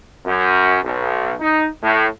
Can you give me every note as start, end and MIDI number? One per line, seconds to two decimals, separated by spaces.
0.25 0.77 42
0.83 1.34 35
1.39 1.66 63
1.83 2.05 45